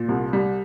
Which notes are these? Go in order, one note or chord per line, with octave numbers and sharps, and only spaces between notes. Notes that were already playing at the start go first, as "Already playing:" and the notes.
Already playing: A#2
C2
G3